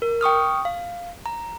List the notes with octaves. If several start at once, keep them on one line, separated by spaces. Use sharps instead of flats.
A#4
G5 C#6 D#6 F6
F5
A#5